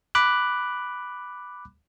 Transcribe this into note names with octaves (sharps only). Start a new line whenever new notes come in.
B5 D6 F#6